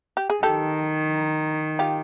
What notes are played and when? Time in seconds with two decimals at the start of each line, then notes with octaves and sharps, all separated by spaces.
0.17 G4
0.30 G#4
0.43 D#3 G4 A4
1.79 F4 G4